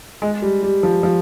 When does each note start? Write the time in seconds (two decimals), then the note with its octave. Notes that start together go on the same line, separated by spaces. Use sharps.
0.22 G#3
0.42 G3
0.63 G3
0.83 F3
1.03 F3